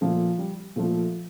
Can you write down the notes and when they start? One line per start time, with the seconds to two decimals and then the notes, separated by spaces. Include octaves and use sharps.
0.01 A#2 F3 A3
0.39 G3
0.76 A#2 F3 A3